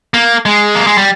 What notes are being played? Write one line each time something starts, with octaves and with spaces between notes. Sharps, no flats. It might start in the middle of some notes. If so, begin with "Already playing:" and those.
A#3
G#3
A#3
G#3
G3